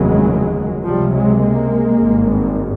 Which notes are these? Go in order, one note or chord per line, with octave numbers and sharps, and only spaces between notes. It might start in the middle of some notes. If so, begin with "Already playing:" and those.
Already playing: F1 D#2 C#3 F#3 G#3
C#2 C3 F3 G3
F#3 G#3
G#3 A#3
G#1 G2